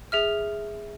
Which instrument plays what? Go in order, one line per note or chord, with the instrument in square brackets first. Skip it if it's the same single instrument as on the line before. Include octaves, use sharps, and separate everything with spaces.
[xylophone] G#4 E5 F6